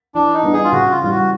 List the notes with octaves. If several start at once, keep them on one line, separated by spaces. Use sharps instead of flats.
E3 D4
D#4
G3 B3 D4
G#4
F4
C#3 F#4
F4
E3 G3 F4
F#4